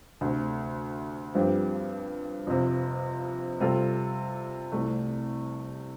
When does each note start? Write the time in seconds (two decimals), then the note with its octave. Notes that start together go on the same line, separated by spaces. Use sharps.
0.21 D2 C3 A3
1.35 G2 F3 C4 G4
2.47 F2 C3 F3
3.60 C3 G3 F4 A4
4.72 C2 C3 A3